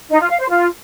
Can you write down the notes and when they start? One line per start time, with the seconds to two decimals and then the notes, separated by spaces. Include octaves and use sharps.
0.10 D#4
0.20 F4
0.29 F5
0.39 C5
0.48 F4